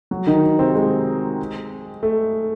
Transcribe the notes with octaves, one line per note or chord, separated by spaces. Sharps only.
F#3 F#4
D#3 D#4
C3 C4
G#3
A3